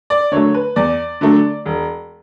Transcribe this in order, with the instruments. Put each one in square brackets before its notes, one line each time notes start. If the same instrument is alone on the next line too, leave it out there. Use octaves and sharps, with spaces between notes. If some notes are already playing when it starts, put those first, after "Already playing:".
[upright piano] D5
D3 F#3 A3 C#5
B4
E2 D5
D3 F#3 A3
E1